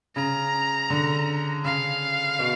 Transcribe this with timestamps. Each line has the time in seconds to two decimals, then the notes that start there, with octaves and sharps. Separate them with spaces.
0.16 C#3 A#5
0.90 D3
1.64 C#3 F5
2.39 B2